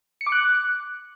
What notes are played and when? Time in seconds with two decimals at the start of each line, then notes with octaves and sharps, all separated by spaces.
0.21 C#7
0.27 D6
0.32 F#6